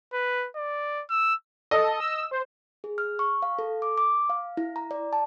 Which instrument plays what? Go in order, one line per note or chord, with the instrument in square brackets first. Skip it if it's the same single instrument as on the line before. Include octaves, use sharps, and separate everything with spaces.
[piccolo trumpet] B4
D5
E6
[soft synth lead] A4 [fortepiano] D#5
[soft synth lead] E6
C5
[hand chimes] G#4
F6
C#6
F5
A4
D6
D6
F5
E4
A#5
D5
A5